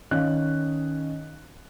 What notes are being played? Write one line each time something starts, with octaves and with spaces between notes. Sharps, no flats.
D#3 C#4 C#5 D#5 F5 F#6